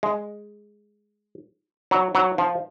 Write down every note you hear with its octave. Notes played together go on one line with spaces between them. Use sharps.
G#3
F#3
F#3
F3